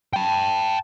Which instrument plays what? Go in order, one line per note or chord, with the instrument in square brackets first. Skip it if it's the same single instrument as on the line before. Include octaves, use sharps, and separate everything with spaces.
[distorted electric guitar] G5 A5